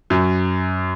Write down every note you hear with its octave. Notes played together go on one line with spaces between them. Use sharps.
F#2